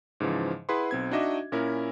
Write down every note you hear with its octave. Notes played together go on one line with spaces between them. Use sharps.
G#2 C#3 E3 F3
E4 G#4 B4 F#5 B5 C6
B1 C4 G#6
D4 D#4 F#4 D#5 E5 D6
A#2 C#4 E4 A#4